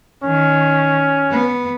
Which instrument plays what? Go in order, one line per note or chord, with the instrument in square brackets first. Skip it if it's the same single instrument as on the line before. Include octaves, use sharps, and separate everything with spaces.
[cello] D#3 [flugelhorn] C#4
[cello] B3